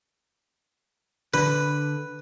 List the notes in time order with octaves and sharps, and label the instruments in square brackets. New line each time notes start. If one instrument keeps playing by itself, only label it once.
[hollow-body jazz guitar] D3 [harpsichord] B4